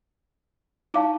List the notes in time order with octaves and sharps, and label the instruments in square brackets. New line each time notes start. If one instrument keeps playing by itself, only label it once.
[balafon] D#4 D6 [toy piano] E4 F5 A5